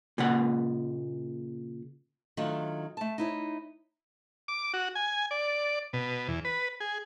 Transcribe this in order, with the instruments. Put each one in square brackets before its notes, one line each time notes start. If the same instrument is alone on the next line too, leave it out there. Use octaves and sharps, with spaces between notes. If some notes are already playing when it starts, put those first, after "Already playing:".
[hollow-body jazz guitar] A#2 C#3 F#5
[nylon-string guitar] D#3 F#3 A3 D4 F4
A3 A5
D#4 E4 C#5
[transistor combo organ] D6
F#4
G#5
D5
B2
E2
B4
G#4